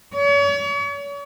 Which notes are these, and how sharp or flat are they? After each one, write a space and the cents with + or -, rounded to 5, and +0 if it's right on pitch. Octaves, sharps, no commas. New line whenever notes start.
C#5 +40